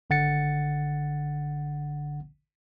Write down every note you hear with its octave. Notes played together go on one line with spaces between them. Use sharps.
G#1 D3 F#5 A6 C#7